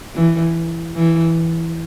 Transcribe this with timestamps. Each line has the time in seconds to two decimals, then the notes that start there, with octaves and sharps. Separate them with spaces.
0.15 E3
0.95 E3